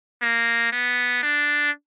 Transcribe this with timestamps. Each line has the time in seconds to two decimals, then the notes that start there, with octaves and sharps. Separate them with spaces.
0.22 A#3
0.72 B3
1.23 D4